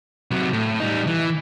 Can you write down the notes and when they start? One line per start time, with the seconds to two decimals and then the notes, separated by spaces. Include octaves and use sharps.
0.31 C3 F#3
0.53 A2
0.80 G3 D#4
1.07 E3